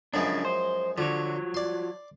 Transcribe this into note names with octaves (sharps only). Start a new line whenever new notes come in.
F#2 C#3 F3 G#3 D4
C5
D3 F3 F#3 C#5
D5 C6